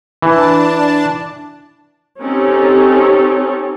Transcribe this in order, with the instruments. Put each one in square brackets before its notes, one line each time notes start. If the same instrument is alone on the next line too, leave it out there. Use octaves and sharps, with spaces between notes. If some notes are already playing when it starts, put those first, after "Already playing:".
[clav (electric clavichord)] E3 [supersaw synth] D4 A5
[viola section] C4 C#4 D#4 G4 A4